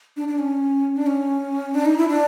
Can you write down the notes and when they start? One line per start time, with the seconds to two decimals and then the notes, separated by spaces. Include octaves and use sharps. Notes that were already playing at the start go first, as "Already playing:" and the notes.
0.17 D4
0.28 D4
0.39 C#4
0.97 D4
1.07 C#4
1.75 D4
1.85 D#4
1.98 E4
2.08 D4